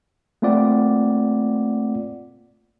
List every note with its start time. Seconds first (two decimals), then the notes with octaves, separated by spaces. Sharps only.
0.42 A3 A#3 C4 F4 D5 F#5